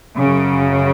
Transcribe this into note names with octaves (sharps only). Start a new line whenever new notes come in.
F#2 C#3